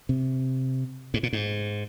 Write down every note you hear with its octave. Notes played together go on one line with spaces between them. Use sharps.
C3
G#2
A#2
G#2